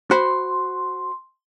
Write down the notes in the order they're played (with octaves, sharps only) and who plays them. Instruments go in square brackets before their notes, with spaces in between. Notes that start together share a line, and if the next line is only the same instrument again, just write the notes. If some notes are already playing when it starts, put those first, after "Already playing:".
[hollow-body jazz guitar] F#4 C5 B5 [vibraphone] C6